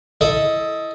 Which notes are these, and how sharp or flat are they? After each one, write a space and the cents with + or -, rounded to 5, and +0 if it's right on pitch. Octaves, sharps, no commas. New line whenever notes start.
E4 +0 A4 +0 D#5 +10